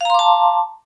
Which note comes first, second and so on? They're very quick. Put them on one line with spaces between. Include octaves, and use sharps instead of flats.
F5 A#5 C6 D6 A5